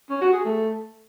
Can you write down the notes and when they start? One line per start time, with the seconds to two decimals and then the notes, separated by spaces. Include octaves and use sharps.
0.10 C#4
0.21 F#4
0.33 G#4
0.45 A3